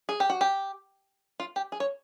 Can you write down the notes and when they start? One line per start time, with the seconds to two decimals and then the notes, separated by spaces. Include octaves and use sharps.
0.09 G#4
0.20 G4
0.30 F#4
0.41 G4
1.40 F4
1.56 G4
1.72 G#4
1.80 C#5